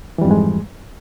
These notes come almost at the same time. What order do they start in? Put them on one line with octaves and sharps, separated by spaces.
E3 G3 F2 G#2 G#3